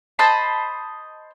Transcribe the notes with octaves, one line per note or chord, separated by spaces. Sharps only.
C5 D#5 A5 B5